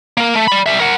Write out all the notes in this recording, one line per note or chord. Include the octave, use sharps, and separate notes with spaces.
A#3 A#4
A3
D5 B5
G3 E5
A#4 F#5